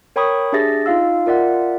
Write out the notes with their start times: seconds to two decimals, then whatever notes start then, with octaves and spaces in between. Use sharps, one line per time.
0.16 A#4 C#5 G5 B5 C#6 D#6
0.52 D4 G4 G#4 E5 A6 A#6
0.86 D#4 F4 F5 E6
1.26 F4 A#4 D5 E5 F#5